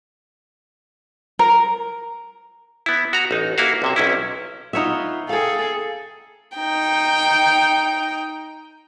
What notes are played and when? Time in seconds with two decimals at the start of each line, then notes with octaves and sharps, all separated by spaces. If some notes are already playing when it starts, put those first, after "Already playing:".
1.39 A#4
2.86 B3 E4
3.13 F#4 A#5
3.31 A1 D#4
3.58 A#3 E4 F#4 F5
3.82 B1 C3 E5
3.96 B1 C#4 E4
4.73 B3 D#4 F4 C#5 E5
5.29 G#4 A4 F5 G5
6.57 D#4 G5